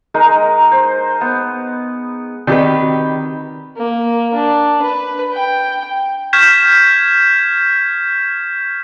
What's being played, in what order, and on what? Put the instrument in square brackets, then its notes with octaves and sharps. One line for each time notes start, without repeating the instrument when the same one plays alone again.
[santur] G#3 D#4 A#4
C5
B3
[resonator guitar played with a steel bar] D#3 G4 B4 [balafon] C4 F#4 D5
[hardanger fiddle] A#3
D4
B4
G5
[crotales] C#6 F6 G6 G#6 B6 E7